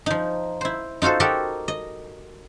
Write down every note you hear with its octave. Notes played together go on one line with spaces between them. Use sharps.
F3 D#4
E4 C5
D#4 F4 F#4 A4 C5
F#4 G4 A4 A#4 D#5 G5
D#5